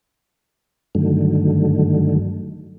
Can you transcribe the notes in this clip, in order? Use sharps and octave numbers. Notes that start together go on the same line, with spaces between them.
G2 D3 D#3 F#3 A3